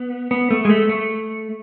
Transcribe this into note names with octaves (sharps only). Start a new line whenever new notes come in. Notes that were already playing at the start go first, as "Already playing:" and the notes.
Already playing: B3
B3
A3
G#3
A3
A3